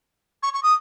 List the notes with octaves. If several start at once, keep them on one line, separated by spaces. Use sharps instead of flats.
C#6
C#6
D#6